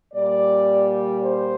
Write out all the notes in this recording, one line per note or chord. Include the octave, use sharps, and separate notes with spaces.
A#2 G3 D5
C5